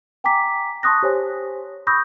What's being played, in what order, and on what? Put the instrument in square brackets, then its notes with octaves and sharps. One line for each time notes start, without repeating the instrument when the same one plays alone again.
[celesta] G5 G#5 A#5 D6 B6
A5 C6 C#6 D#6 F#6 A#6
G4 C5 C#5 G#5
B5 C#6 D#6 E6 G6 A#6